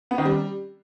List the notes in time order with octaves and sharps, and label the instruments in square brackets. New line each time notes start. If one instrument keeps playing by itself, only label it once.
[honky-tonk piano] B3
D#3
G3